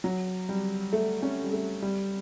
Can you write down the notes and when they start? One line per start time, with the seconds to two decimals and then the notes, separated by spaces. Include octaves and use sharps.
0.04 F#3
0.49 G3
0.93 A3
1.22 C#4
1.44 G3
1.53 A3
1.82 G3